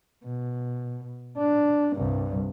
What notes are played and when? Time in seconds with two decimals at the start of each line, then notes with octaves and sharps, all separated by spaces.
0.25 B2
1.38 D4
1.96 C2 G2